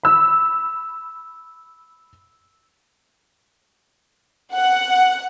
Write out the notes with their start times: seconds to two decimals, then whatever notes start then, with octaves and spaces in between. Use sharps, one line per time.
0.03 B5 E6
4.53 F#5